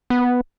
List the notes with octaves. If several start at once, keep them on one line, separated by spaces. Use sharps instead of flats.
B3